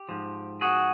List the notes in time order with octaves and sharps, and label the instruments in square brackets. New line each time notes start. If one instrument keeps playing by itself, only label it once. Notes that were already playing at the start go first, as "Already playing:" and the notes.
Already playing: [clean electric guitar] G4
G#2 F3
F#4 G#4